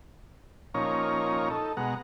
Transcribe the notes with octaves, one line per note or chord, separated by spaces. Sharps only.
A#2 F3 C#4 D#4 C#5 A#5
D#4 A4
B2 G#3 F#5 A#5